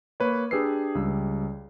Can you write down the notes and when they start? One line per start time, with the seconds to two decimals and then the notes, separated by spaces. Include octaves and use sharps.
0.20 A#3 B4 C#5
0.51 D4 G4 G#4 B4 E6 C7
0.95 C#2 G3 E6